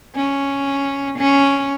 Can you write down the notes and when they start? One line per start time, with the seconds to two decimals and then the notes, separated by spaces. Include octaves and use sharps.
0.16 C#4
1.18 C#4